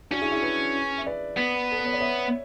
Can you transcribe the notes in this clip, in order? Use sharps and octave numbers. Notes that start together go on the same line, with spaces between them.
C#4 D4 F#4
E4 G#4
E4 G#4
G#4 B4
E5
B4 D5
B3
A4
B4
C#5
D5
C#5 E5